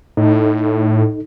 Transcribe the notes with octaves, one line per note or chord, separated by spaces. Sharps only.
A2 D#4 A4